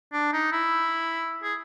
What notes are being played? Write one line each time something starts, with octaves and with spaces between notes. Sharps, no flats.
D4
D#4
E4
G#4